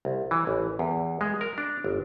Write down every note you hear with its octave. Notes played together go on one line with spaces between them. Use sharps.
C2
E3
A1
E2
G#3
A#4
D4
G1